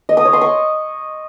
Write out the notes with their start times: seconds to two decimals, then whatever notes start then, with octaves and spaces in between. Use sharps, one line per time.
0.09 D#5
0.17 D#6
0.25 C#5
0.33 C6
0.41 C#6